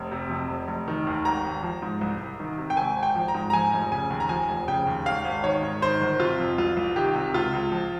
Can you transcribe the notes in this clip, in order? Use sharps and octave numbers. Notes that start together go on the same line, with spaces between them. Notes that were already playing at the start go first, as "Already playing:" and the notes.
Already playing: F1
C3
F2
F1
F1
D#3
D#2
G#1 A#5
G#1
F3
G#2
C2
C2
D#3
C3
G5
G#1 G#5
G#1
G5
F3
A#5
G#2
A#5
F3 G#5
F1
C#3 G#5
D#2
A#5
F3 G#5
F1
C#3 G5
D#2
G#1 F5
G#1
D#3 C#5
G#2
D#3 C5
G1
C3 F4
F2
C2 F4
C2
D#3 G4
C3
C#2 F4
C#2
F3